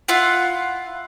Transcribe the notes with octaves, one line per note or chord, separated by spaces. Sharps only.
E4 F4 F#5